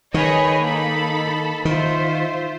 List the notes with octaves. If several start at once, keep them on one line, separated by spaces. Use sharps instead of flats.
D#3 G#4 B4 C#5 D#5
A#3 D#4 A4 B5
D#3 F4 C5 E5